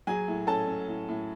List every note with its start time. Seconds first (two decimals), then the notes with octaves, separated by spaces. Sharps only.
0.07 F#3 G#4 G#5
0.28 A2
0.47 C#4 A4 A5
0.67 C#4
0.88 A2
1.09 A2